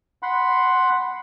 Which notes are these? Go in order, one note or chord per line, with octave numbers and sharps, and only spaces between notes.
F#5 B5 C6